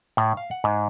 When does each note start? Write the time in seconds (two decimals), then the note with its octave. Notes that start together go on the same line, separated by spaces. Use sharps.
0.17 A2
0.37 F5
0.51 F#5
0.64 G#2